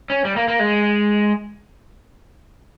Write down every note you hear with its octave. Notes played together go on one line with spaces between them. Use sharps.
C#4
G3
A#3
A#3
G#3